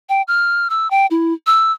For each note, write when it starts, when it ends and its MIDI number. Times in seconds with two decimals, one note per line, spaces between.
0.09 0.22 79
0.28 0.68 89
0.70 0.90 88
0.91 1.06 79
1.11 1.33 64
1.47 1.72 88